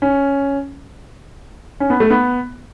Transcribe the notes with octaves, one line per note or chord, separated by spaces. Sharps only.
C#4
C#4
B3
A3
B3